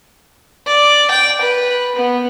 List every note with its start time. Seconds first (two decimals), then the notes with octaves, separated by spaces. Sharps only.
0.67 D5
1.11 G5
1.41 B4
1.96 B3